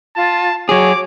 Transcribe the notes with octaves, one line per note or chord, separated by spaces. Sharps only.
F4 A5
F#3 G#4 C#5 D6